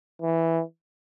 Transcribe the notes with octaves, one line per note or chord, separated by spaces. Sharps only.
E3